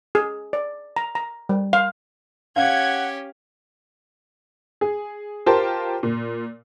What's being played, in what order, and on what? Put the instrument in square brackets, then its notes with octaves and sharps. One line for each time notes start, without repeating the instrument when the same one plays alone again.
[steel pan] G#4
D5
A#5
A#5
G3
F5
[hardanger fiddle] C#4 G4 [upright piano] F5 [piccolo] F#5 [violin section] G#6
[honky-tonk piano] G#4
F4 G4 A#4 C5 G5 A5
A#2